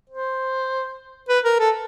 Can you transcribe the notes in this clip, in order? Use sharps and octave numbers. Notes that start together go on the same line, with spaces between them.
C5
B4
A#4
A4